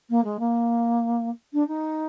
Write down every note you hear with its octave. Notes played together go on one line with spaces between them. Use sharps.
A#3
G#3
A#3
D4
D#4